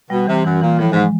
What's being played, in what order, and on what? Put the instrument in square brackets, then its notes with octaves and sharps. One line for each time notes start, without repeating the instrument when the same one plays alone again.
[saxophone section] B2 [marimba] G3
[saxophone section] C3 [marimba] E3
[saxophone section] F#2 [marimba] E3
[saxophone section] A#2 [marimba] E3
[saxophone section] A2 [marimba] F3
[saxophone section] G#2 [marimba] G#3